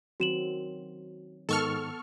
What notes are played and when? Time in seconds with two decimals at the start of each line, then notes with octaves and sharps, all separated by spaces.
0.20 D#3 F#3 C4 F#4 E7 F#7
1.49 G#2 D#3 B3 A4 C#6 F6